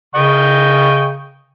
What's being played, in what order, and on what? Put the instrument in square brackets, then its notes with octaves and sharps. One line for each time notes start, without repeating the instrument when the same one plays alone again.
[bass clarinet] C#3 [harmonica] D#5 G5 C#6